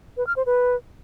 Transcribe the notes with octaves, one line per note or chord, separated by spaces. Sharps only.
B4
F6
C5
B4